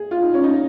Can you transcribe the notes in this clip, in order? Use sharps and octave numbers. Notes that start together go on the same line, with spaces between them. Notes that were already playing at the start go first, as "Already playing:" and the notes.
Already playing: G#4
F4
D#4
C#4
D#4